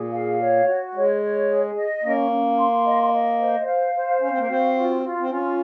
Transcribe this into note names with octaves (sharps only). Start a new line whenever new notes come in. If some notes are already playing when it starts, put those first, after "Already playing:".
Already playing: A#2 G#4
F5
C#5
F#4
G#3 C#5
C#5
G#4
D#5
A#3 C#4
C#4
C6
D#5
D#5
C5
F5
C5
C#4 F5
C4
A#3
C4 F#4
F4
F4
C4
C#4 F4